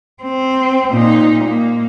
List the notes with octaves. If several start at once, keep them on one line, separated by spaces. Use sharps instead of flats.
C4
A#2 D#4
A#3